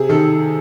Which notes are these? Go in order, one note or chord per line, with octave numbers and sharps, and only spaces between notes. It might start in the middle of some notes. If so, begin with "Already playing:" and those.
Already playing: C3 G#4
D#3 A4